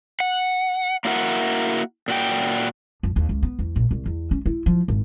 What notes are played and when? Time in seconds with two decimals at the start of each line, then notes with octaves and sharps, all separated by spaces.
0.20 F#5
1.05 A#3 D4 E4 F#4 A#4 F#5
2.08 A#2 F#4 G5
3.03 F2
3.16 D#2
3.29 C#2
3.43 B3
3.59 E2
3.76 A#1
3.91 C2
4.06 E2
4.31 C#4
4.46 E4
4.66 F3
4.88 G#1